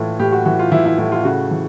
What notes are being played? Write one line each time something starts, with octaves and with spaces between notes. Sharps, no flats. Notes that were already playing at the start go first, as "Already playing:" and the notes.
Already playing: A2 E3 F4
A2 G4
F#4
E3 F#4
F4
E3 E4
E4
A2 E4
F4
C#3 F#4
E3